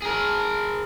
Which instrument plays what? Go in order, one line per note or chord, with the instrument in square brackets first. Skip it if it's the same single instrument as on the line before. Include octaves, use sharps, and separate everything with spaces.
[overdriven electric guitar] G#4 A#4